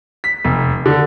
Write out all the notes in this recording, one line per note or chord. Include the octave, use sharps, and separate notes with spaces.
B6
F1
D3